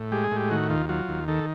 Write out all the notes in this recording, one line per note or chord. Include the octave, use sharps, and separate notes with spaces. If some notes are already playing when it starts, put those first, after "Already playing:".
Already playing: A2
G#3 G4
G#4
A2
G4
D#3 F#4
D#2 F4
F#3 F4
D#2
D#3 A4